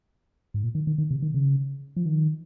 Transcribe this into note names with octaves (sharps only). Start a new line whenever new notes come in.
G#2
A#2
D#3
D#3
D#3
C3
D#3
C#3
F3
D#3